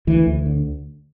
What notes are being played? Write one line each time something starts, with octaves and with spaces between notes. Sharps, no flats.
D2 E3
D2
D3